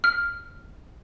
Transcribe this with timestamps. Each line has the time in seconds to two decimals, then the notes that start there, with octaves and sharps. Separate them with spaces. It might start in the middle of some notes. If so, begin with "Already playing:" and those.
0.04 F6